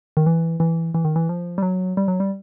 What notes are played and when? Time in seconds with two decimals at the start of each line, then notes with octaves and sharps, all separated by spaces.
0.17 D#3
0.26 E3
0.60 E3
0.94 E3
1.05 D#3
1.16 E3
1.29 F3
1.58 G3
1.63 F#3
1.97 G3
2.08 F#3
2.20 G3